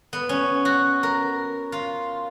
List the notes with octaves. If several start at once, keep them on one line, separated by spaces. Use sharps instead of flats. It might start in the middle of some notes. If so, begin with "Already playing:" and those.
B3
C#4
F#4
A#4
F4